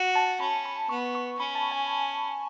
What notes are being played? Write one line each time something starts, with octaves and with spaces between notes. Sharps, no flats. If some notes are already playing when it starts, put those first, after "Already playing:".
Already playing: F#4
A5
C#4 B5
B5
B3 C#6
C#6
C#4 B5
A5
G#5